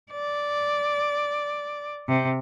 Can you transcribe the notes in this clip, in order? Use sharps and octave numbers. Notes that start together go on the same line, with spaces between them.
D5
C3